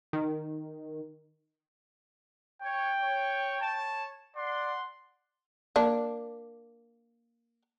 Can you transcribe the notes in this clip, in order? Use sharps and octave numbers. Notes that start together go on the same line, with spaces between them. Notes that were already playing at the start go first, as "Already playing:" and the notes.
D#3
C#5 G5
C#5
C#5 A5
D5 F#5 C6
A#3 D4